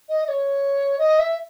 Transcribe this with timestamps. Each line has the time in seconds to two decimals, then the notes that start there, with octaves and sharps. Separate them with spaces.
0.09 D#5
0.24 D#5
0.28 C#5
0.98 D#5
1.19 E5